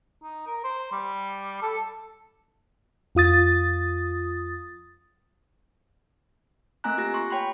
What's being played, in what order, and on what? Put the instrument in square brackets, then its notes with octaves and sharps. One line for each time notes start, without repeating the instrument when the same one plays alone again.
[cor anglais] D#4
A#4
C5
G3
A4
[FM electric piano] F2 F4 D#6 A6
[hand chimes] A3 A#3 C4 G#5 A#5 F#6
F4 G4 A#6
C6 C#6
C#5 G5 B5 C6